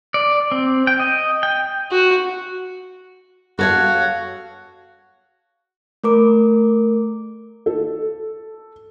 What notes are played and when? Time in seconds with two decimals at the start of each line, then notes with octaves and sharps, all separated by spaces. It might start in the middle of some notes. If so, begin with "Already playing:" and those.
0.14 D5
0.52 C4
0.87 G5
0.99 D#5
1.43 G5
1.91 F#4
3.59 F#4 A4 C#5 F5
6.04 A3 A#4 D6
7.66 A4